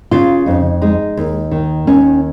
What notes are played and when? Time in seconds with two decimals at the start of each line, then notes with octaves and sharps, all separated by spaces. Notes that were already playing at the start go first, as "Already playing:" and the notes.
0.11 C#3 F4
0.46 F2 D#4
0.82 G#3 D#4
1.17 D#2
1.51 D#3
1.87 D#2 C#4